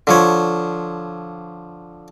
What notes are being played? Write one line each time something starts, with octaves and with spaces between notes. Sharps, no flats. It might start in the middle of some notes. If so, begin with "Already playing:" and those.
D3 F3 C#5